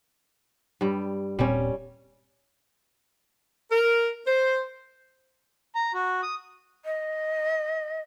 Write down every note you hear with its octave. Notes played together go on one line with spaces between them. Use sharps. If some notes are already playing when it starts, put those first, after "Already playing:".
G2 G3
D#1 A#2 G3 C4 C#4
A#4
C5
A#5
F#4
D#6
D#5